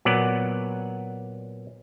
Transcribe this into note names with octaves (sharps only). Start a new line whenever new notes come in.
A#2 F#3 B3 D5 F#5